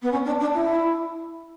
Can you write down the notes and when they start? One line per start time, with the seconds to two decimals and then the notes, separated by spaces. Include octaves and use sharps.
0.02 B3
0.11 C#4
0.25 D4
0.40 D4
0.54 E4